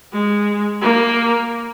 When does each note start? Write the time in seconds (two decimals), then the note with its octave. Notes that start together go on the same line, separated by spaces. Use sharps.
0.13 G#3
0.82 A#3